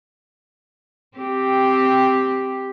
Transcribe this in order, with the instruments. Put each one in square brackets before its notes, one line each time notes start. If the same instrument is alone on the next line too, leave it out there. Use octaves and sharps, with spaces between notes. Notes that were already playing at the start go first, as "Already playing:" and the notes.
[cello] C4 G4